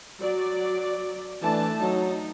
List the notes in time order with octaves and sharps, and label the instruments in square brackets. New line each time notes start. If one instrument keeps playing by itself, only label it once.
[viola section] F#3 D5
[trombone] E3 [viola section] A3 D4 A5
[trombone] F#3 [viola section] D#4